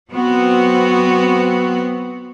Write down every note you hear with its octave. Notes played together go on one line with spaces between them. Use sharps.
F#3 B3 C4 F#4